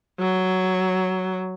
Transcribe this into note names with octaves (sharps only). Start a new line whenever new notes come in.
F#3